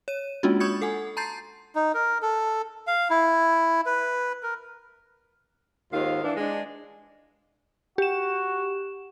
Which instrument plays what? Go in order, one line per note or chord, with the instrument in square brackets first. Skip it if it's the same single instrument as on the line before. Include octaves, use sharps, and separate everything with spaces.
[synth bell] C#5 D#7
G#3 A#3 C#4 D4 F4 F#4
B5 C#6 D#6 G6 G#6 C#7
A4 F#5 G#5
A5 A#5 C6 G6 A6 C7
[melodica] D#4
A#4
A4
F5
E4
B4
A#4
[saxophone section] D#2 G#2 D#3 F4 F5
E3 D4
G#3 D4
[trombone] F#4 [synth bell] G4 E7